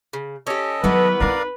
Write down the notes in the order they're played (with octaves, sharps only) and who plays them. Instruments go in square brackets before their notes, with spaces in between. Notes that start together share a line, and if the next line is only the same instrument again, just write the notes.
[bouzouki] C#3
[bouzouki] C#4 G4 [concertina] A4 D#5
[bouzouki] D#3 E3 B3 [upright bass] F#3 [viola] B4
[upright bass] C4 D#4 [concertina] A#4 D5 F5